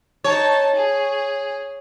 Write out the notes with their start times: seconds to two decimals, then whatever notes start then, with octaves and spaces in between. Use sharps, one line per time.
0.24 D#4 C#5 A5
0.75 G#4